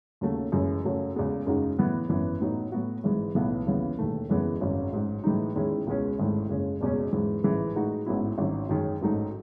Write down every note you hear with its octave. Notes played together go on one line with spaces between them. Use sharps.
D#2 C#3 F#3 A3 C#4
F#1 F#2 E3 G#3
F#2 C#3 F#3 A3
E2 C#3 G#3 B3
F#2 C#3 G#3 D#4 F#4
A2 E3 B3
G#1 F#2 E3 B3
A2 F#3 B3 D#4
A2 F#3 B3 F#4
G#1 G#2 E3 G#3
B1 A2 E3 B3
D#2 C#3 E3 B3
E1 D#2 D#3 A3
F#1 F#2 E3 G#3 B3
G#1 F#2 C#3 F#3
A1 G#2 F#3
A2 E3 G#3 D#4
E2 D#3 G#3 C#4 E4
C#2 B2 G#3 C#4
G#1 G#2 D#3 A3 E4
F#1 F#2 C#3 G#3 C#4
F#1 E2 B2 G#3 C#4
G#2 E3 G#3
A1 G#2 E3 G#3
A2 G#3 D#4 F#4
A1 G#2 F#3 B3 E4
G#1 G#2 D#3 F#3 C#4
F#2 D#3 G#3 C#4
A1 G#2 F#3 A3 D#4